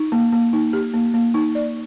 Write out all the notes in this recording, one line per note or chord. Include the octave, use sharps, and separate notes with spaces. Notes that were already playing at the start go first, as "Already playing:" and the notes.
Already playing: D#4
A#3
A#3
D#4
G4
A#3
A#3
D#4
D5